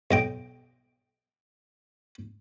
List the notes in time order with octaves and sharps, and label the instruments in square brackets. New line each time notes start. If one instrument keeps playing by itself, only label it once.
[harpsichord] B1 D#5 G5